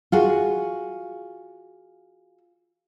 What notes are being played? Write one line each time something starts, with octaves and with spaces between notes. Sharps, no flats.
F4 F#4 G#4